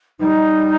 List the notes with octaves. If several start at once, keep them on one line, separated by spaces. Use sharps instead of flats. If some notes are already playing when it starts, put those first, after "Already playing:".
G3 D#4